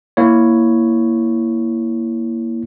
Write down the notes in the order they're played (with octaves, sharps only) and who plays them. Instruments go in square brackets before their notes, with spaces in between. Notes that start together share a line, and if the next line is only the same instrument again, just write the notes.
[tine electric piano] A#3 E4 C#5